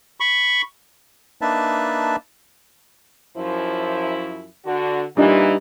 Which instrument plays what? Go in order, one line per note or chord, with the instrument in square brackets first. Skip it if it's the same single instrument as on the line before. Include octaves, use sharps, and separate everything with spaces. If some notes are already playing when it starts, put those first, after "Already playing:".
[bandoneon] B5 C#6
A#3 D4 D#4 B4 E5 A5
[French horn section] F#2 F3 E4
D3 F#4
[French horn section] A#2 E3 [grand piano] G3 D4 D#4